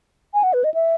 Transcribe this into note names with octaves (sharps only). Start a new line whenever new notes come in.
G#5
F#5
B4
D#5
E5